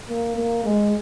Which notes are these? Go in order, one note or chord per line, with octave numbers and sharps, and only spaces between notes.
A#3
A#3
G#3